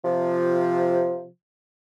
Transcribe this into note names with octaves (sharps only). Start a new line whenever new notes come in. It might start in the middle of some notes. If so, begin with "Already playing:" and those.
C3 F3